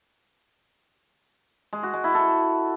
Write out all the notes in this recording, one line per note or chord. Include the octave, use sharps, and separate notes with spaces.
G#3
F#4
G#3
E4
A4